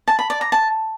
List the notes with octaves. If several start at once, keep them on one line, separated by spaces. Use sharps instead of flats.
A5
B5
D5
A#5
A5